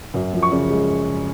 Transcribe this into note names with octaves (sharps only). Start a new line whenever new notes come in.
F#2
F3
C#6
C#3
G#3